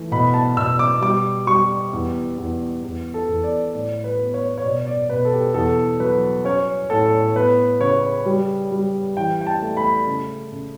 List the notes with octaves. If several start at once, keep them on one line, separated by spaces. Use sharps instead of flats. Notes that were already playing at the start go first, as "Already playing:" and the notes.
Already playing: E3 A3
B2 B5
A5
B2 E6
D6
G3 D6
G3 C#6
E2
E2
E2
A4
E2
D5
A2 D5
B4
B3
C#5
C#5
B2 D5
D5
B2 B4
A4
G4
E2 A4
F#3 B4
C#4 C#5
A2 A4
B3 B4
C#3 C#5
G3
G3
E3 G5
G5
A5
A3
B5
C#3
C#3